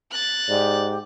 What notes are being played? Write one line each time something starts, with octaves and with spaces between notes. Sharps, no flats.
F#6 A6
G#2 G4 D5